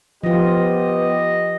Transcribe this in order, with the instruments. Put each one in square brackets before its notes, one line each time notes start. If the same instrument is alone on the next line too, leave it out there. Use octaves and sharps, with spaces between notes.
[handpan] F3 F4 [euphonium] B3 [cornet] G4 [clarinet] D#5